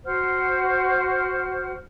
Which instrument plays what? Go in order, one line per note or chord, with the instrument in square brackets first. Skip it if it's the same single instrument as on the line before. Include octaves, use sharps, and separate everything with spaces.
[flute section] F#4 C5 F#5 F6